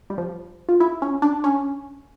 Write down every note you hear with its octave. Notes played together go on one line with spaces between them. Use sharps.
G3
F3
F4
E4
C#4
D4
C#4